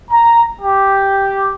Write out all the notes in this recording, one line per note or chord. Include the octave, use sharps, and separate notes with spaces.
A#5
G4